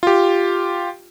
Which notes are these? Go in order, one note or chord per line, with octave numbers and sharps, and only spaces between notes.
F4 G4